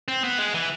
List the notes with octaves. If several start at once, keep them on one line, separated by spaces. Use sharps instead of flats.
C4
B3
G#3
E3